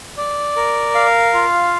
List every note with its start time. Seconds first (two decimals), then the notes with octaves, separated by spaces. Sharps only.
0.17 D5
0.56 A#4
0.95 F5
1.34 F4